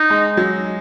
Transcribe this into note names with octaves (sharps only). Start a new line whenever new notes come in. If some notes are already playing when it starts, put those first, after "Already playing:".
Already playing: D#4
G#3
F#3